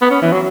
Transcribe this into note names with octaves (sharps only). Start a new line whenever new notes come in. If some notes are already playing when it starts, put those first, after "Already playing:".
B3
C#4
E3
F#3